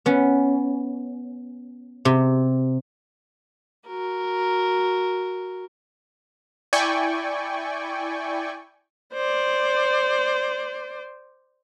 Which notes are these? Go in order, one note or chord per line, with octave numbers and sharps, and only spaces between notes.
B3 C#4
C3
F#4 A#4
E4 D5 G5 G#5 C#6
C5 D5